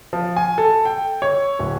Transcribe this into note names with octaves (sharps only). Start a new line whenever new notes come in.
F3
G#5
A4
G5
C#5
D1